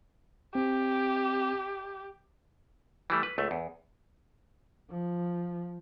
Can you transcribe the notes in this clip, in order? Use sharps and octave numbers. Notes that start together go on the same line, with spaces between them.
C4 G4
E3 G3 A3
B4
C#2 A3
E2
F3